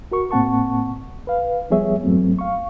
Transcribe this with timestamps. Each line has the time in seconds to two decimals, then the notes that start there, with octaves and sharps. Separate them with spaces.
0.11 F#4 A#4 C#6
0.31 A2 A#3 C4 F#5 A5 C#6
1.27 B4 F5
1.70 F3 G3 B3 G#4 C#5 E5
2.03 E2 G2 F#3 A3 B3 C4
2.39 F5 C#6